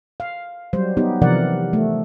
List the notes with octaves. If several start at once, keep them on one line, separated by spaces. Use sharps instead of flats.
F5
F#3 G3 C5
B3 D#4 G4
C3 E3 F3 A#4 D5 F#5
A3